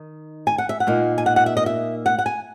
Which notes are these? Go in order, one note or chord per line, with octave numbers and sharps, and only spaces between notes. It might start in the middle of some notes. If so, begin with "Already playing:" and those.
Already playing: D#3 D#4
G#5
F#5
E5
F#5
A#2 A#3 D#4
G#5
F#5
F#5
E5
D#5
E5
F#5
F#5
G#5